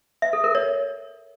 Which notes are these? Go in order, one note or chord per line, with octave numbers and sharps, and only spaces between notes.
E5
A4
A#4
C#5